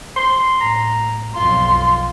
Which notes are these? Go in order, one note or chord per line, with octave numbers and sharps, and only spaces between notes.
C6
A2 A#5
B1 F2 F4 C6